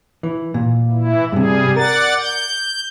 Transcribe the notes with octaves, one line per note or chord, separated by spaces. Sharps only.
E3
A#2
E3 E4
G2 C3 G3 G#4
A#4 D5 F#5 A6
G6